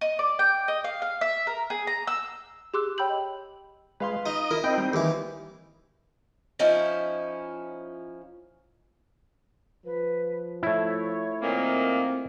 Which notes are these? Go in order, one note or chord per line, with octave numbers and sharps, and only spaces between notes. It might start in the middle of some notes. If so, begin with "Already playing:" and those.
D#5
D5
G5
D#5
F5
F5
E5
A#4
G#4
A#5
E6
G4 G#4 C6 D6 E6 F#6
C#5 G5 B5 E6 G6 F#7
D#5
G#3 B4 F5 C6
D#4 D#5 D#6
E4 A#4
C4 D#4 D#5 G5 B5
G3
D#2 E3
F3 C#4 D#4 E4
F3 B4
A3 E4 C#5
A#2 D#3 A#3 C4